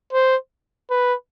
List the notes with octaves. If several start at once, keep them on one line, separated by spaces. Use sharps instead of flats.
C5
B4